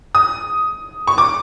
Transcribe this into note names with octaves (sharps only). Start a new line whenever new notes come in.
D#6
C#6
D6